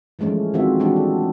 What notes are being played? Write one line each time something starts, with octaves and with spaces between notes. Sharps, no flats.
E3 F3 G#3 A3 C#4
D#3 G#3 C4 F4 F#4 E5
E3 G3 G#3 D4 F#4
A4